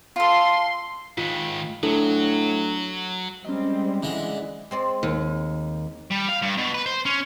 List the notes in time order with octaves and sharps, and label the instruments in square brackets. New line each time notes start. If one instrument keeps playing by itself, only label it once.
[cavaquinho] F4 A4 [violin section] C6
[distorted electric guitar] G#2 D#3 [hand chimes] F4
[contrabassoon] A2 [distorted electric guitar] F#3 [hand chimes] D4 A4
[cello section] G3 G#3 C4 [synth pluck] C#4 D#5
[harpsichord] D3 G#3 [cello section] E3
[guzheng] G#3 C4 D5
[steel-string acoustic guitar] D#2
[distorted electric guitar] G3
F5
G2
B2
B4
C5
C#4